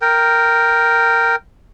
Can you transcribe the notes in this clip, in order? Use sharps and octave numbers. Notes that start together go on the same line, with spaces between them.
A#4 G5